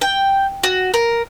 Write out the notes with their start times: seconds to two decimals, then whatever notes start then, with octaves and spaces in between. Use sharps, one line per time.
0.01 G5
0.63 F#4
0.94 A#4